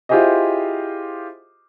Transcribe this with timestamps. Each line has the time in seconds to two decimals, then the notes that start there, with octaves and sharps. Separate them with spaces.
0.09 E4 F4 G4 G#4 C5 D#5